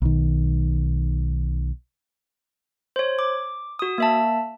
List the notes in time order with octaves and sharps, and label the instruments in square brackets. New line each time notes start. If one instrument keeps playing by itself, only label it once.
[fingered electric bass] B1 D#3
[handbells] C5 C#5
D6
F#4 D#6
A#3 E5 A5